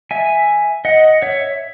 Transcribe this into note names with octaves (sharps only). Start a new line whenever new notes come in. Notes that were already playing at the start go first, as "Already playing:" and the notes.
E5 G#5
D#5 F#5
C#5 E5